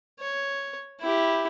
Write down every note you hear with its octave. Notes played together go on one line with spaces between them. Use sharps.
C#5
E4 G4